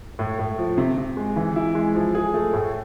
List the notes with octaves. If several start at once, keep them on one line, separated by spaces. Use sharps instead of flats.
A2
A2
F3
C3
C3
G#3
E3
E4
G#3
F3
G#4
A3
A2